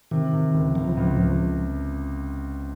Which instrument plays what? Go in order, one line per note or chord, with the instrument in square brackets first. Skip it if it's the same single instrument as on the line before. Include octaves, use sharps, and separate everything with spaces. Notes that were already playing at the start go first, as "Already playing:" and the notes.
[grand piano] C3 [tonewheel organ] D#3
[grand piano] C3
C#2
[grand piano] C#2 [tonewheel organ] F3
[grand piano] C#2
C#2